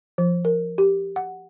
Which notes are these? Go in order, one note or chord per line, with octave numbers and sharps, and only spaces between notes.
F3
A#4
G4
F#5